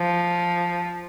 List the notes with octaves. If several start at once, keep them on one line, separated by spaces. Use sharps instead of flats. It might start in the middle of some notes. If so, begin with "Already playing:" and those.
Already playing: F3